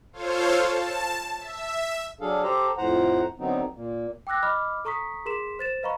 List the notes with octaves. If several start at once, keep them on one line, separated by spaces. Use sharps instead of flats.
F4 A4 C5 C#5 F5
A5
E5
F#3 D4 G#4 A4 F5
G4 A4 C5 A#5
F2 A2 C5 F#5 A#5
D3 F#3 B3 C4 D#4
A#2
G5 D6 E6 F#6 A#6
D#5 B5 D6 F6
A4 A#5 C#6 D#6 B6
G#4 A#4 C6 B6 E7
C5 A6 E7
B4 D#5 F5 A#5 B5 C#6